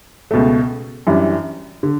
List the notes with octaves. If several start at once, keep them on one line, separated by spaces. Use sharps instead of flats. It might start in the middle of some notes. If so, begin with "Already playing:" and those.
C#2 B2 A3
F#2 E3 G3 D4
D3